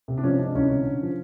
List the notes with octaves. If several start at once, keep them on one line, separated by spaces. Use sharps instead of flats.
C3
D4
F3 C#4
G#3 D4
C2 C#4
D3
D3
F3